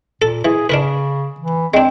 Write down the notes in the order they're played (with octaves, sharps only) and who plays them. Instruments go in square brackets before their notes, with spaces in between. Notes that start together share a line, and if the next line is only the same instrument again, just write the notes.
[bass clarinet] A#2 [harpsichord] A4
[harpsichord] E3 [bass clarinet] G#4
[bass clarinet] C#3 [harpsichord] D4 A#4 B4
[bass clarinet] E3
[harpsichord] G#3 D4 [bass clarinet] C4